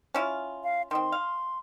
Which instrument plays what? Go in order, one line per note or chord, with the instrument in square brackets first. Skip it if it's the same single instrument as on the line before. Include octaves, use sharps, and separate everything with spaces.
[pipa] C#4 E4 F4
[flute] F5
[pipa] D#3 C4 [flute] C6
[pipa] F5